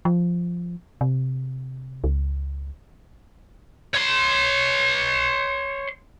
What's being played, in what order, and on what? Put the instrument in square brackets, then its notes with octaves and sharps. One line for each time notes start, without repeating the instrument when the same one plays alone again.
[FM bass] F3
C3
C#2
[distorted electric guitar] C#5 C6